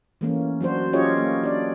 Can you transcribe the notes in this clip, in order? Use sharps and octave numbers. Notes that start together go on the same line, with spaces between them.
E3 A3 A#3 C#4
F#3 D4 F#4 C5
C#4 F4 G4 A4 C#5 D#5
A#3
D4 D5